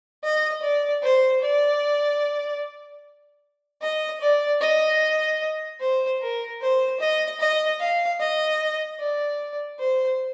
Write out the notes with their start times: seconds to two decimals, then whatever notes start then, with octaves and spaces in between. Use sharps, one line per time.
0.23 D#5
0.62 D5
1.03 C5
1.42 D5
3.81 D#5
4.21 D5
4.61 D#5
5.80 C5
6.21 A#4
6.61 C5
7.00 D#5
7.40 D#5
7.80 F5
8.20 D#5
8.99 D5
9.79 C5